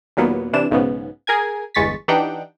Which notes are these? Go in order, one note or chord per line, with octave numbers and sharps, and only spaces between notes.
D#2 A#2 F#3 A#3 B3
C3 E3 D4 E7
B1 G#2 C#3 B3
G#4 A#4 G#5 G#6
G1 E2 G#3 C#6 A6 B6
E3 D4 D#4 G4 F#5 G5